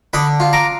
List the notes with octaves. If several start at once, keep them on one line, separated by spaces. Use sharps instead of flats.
D3 B5 D#6
F4
A#5 D6